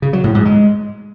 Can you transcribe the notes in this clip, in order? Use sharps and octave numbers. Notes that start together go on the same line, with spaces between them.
C#3
F#3
A2
G#2
G#3